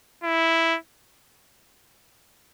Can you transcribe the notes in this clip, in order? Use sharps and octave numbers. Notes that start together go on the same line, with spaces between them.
E4